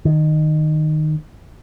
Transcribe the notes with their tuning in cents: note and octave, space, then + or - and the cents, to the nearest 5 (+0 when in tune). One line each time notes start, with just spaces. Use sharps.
D#3 -15